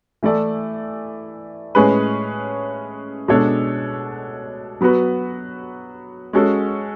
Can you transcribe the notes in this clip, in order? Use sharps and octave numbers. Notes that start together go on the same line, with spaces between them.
E3 A3 E4 A4 D5
A2 G#3 C#4 G#4 B4
B2 G#3 D4 A4 C#5
F#3 B3 F#4 B4
G#3 C#4 F#4 A4